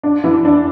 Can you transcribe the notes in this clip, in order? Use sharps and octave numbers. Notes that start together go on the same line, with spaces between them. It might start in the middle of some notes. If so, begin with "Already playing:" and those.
D4
E3
D4